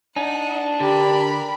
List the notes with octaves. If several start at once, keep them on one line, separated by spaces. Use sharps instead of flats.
D4 D#4 F#5
D3 G4 A#4 B5